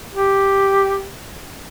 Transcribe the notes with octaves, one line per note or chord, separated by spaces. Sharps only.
G4